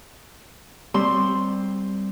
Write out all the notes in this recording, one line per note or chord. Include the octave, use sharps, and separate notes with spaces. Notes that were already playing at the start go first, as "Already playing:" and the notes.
G3 C4 C6